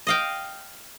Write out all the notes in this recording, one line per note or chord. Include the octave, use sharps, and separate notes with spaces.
D#5 F5 G5